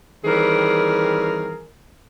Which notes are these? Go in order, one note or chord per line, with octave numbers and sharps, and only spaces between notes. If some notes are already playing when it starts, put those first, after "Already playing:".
D#3 E3 G3 C4 G#4 A#4